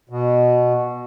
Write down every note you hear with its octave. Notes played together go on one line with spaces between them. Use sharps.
B2